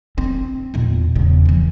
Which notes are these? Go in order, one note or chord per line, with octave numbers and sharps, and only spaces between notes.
C4
E2 A#2
E2 C#3
E3 F3